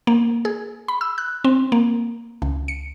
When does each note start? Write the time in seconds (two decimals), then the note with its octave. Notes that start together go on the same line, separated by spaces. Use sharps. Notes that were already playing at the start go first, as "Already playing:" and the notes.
0.07 A#3
0.45 G#4
0.88 B5
1.01 E6
1.18 F#6
1.44 C4
1.72 A#3
2.42 C#2
2.68 C#7